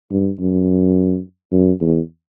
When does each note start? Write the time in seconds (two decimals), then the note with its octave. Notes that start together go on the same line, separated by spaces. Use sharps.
0.11 G2
0.40 F#2
1.52 F#2
1.80 E2